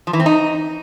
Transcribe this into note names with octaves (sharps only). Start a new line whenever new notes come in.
F3
E3
C4
D#4